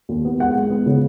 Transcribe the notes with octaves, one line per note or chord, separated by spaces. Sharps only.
D#2
B3
G#3 F#5
G#3
B3
C#3